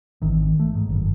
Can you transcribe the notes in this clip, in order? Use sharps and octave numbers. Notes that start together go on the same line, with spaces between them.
G#1 D#3 E3
A3
G#2
F#1 D#3